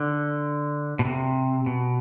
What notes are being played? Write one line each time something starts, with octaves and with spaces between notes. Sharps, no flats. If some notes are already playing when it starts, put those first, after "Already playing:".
Already playing: D3
B2
C3
B2